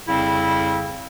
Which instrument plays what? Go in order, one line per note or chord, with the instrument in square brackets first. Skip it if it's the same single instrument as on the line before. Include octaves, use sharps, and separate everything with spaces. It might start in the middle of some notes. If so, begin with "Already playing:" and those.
[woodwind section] F2 C#3 G3 C4 E4